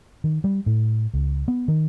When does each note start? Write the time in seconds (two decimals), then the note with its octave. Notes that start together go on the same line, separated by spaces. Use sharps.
0.24 D#3
0.44 G3
0.66 A2
1.14 C#2
1.48 B3
1.68 D#3